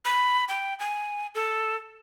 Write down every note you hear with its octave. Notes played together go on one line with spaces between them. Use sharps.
B5
G5
G#5
A4